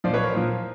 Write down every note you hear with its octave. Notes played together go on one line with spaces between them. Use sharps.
A#2 F3 C5 D5
B4 C#5
A#4 C5
A#2 F3